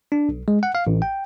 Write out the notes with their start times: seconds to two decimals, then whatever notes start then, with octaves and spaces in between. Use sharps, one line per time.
0.12 D4
0.29 B1
0.48 G#3
0.63 F#5
0.75 F5
0.87 A1
1.02 G5